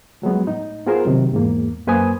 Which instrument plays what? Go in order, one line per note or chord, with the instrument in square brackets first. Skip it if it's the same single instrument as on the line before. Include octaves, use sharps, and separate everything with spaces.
[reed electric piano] F3 F#3 G#3 B3
A2 D#4
B3 F4 G#4 A#4 C5
C3 D#3 F#3
E2 G#2 A#3
F#2 A#3 B4 C5 G#5 D#6